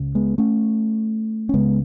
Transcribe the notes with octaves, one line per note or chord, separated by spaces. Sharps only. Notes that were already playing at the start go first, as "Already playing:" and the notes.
Already playing: C#2 C#3
G#3 B3
A3 C#4
C#4
C#2 C#3 G#3 B3